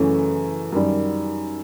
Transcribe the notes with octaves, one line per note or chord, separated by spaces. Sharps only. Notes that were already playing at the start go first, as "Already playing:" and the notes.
Already playing: F#2 C#3 E3 A3 C#4
F#2 D#3 G3